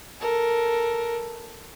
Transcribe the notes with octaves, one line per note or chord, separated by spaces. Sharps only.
A4 A#4